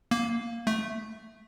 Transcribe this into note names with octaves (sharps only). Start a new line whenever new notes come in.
A#3
A3